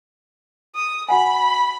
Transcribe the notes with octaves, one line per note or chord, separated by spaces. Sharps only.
D#6
F#4 F#5 G#5 B5